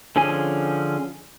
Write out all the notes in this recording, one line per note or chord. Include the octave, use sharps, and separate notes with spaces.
D3 F3 C#4 G#4 G#5